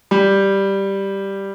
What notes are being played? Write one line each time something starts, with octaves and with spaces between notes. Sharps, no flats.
G3